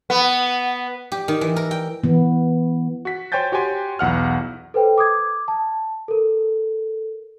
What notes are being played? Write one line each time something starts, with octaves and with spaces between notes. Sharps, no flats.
B3
G4
D#3
E3
A#4
G5
E3 B3
F#4 B6
C5 C#5 G5 G#5 G6 A6
F#4 G4 C#5 G5 G#5 C6
B1 E2 F#5 F6
A4 B4 C5 G5
D6 D#6 G#6
A5
A4 A#4